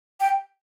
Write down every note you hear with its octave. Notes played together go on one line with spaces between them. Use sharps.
G5